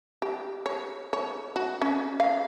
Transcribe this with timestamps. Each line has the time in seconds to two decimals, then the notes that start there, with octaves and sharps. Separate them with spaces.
0.22 G4
0.66 C#5
1.13 C#5
1.56 F#4
1.82 C#4
2.20 F5